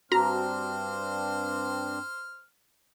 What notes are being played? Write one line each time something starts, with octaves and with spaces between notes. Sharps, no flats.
G2 C4 D4 F#4 C5 A#5 F6